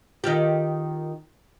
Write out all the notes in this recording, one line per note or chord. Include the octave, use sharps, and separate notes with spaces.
D#3 F4 G4